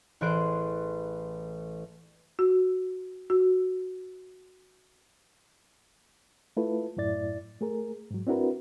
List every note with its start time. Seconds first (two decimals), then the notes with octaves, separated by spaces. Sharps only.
0.21 A1 E3 G#4 C5 F#6 D7
2.39 F#4
3.30 F#4
6.57 A3 E4 F4 A4 B4
6.97 F#2 A2 E4 D5 A6
7.61 A3 G#4 A#4
8.11 G#2 F#3
8.27 C4 D4 E4 F#4 A#4 B4